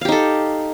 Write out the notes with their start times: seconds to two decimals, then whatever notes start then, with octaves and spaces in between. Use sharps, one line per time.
0.01 F5
0.05 G4
0.08 D#4
0.12 A4